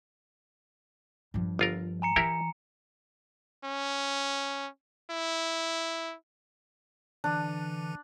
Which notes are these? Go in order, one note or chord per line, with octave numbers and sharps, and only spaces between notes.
G2 F3
G1 F4 A#4
G#5 A#5 C#7
E3 E4 G4 A#4
C#4
E4
D3 E3 D4